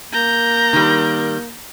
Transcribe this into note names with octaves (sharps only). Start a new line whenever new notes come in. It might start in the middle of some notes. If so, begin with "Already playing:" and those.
A#3 A#5 G6
D#3 G3